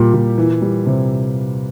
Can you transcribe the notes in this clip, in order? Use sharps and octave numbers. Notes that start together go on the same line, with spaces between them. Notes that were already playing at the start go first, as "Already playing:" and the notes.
Already playing: A#2 G3 G4
A#2
E3
G3
C3